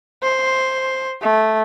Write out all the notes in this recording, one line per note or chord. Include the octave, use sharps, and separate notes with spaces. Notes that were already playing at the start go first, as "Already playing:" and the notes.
C5
A3